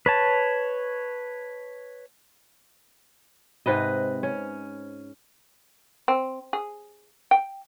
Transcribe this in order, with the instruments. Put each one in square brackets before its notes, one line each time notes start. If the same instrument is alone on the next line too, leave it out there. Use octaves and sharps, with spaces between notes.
[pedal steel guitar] B4 C#5 A5
[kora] G#2 C3 B4 D#5
C#4
[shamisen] C4
G#4
G5